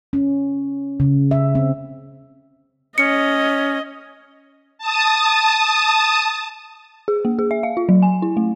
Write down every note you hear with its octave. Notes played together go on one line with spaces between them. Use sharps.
C#4
C#3
E5
C4
C#4 D#5 C#7
A5 D#6
G#4
A#3
G#4
E5
F5
F4
F#3
G#5
E4
A3